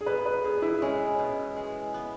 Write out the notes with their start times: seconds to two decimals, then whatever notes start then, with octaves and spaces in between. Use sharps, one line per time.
0.01 G#4
0.06 B2 B4
0.26 B4
0.44 B2 G#4
0.62 E4
0.81 G#3 C#4
1.19 B2
1.56 G#3
1.94 B3